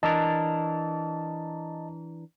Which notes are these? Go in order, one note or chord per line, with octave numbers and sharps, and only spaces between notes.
E3 D4 A#4 D#5 A5